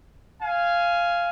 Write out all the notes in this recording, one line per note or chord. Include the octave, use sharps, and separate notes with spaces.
F5 G#5